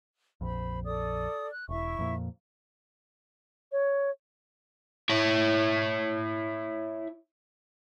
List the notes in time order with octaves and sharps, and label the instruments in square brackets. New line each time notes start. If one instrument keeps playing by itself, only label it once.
[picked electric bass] A#1 F2 [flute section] C5 B5
[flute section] A4 D5 D#6
F#6
[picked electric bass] E1 [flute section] E4 E5 C#6
[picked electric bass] F2 A#2
[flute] C#5
[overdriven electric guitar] E4 C#5